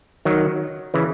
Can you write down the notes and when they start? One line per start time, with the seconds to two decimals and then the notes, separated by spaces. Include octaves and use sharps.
0.25 D#3 F#3
0.94 C#3 E3